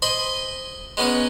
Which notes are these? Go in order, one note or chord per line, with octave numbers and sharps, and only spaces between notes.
C5 D#5 G#5 B5
G#3 B3 C#4 D#4